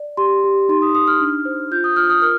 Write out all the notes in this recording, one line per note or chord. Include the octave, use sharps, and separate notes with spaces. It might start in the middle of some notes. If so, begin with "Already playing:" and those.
Already playing: D5
G4 C6
G4
D#4 C6
D#6
D#4 D#6
F6
D4
C5
F4 G6
D#6
F4 F6
D#6
A#4 F6